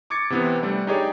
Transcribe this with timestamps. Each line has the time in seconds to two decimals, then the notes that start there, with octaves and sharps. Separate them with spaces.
0.10 C#6 D6 G#6 A6 C#7
0.30 C3 E3 B3 C4
0.63 G3 A3 D4
0.87 D#4 G4 G#4 C#5 D5